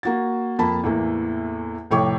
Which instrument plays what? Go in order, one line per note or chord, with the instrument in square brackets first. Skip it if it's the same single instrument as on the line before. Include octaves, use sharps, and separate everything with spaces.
[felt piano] A#3 F#4 A6
F2 A#3 A5 B5
E2 A2 E3 A#3
F1 A2 C#5 G5 C#6 D6